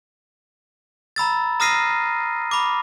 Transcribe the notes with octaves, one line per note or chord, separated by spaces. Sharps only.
A#5 B5 E6 A6
A#5 D#6 F6 A#6 C7 D#7
B5 D6